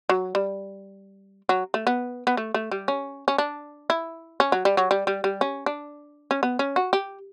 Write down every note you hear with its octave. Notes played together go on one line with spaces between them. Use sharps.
F#3
G3
F#3
A3
B3
B3
A3
A3
G3
C#4
C#4
D4
E4
C#4
F#3
G3
F#3
G3
G3
G3
C#4
D4
C#4
B3
C#4
F#4
G4